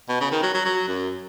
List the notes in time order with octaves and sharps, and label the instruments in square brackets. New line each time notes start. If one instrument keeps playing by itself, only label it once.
[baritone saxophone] B2
C#3
D#3
F#3
F#3
F#3
F#2